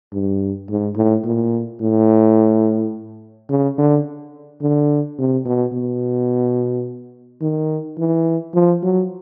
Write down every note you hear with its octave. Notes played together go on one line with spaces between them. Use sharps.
G2
G#2
A2
A#2
A2
C#3
D3
D3
C3
B2
B2
D#3
E3
F3
F#3